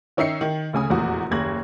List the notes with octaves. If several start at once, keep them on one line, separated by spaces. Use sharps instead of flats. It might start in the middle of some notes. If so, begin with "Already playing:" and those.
D#3 C#4 D#4 E5 C7 C#7
D#3
D2 C#3 G#5 D#6
F1 E2 A#2 F#4
F#1 D#2 G#6 A#6 F#7